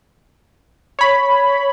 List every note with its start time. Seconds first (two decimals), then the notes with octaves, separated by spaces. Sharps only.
0.99 C#5 B5